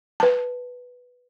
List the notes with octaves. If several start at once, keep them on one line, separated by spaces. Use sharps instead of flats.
B4 A5